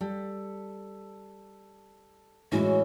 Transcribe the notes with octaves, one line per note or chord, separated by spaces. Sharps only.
G3 A4
A2 E3 G#3 C#4 E4 F#4